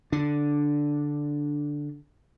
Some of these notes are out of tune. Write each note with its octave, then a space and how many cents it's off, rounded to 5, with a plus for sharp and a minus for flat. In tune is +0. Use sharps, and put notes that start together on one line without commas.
D3 -5 D4 +0